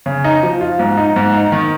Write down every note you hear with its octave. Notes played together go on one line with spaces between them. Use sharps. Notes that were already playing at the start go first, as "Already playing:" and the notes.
C#3
D#4
F3
F4
G#2
D#4
G#2
D#4
D#3